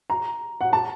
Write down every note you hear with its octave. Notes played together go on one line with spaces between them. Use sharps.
A#5
F#5
A5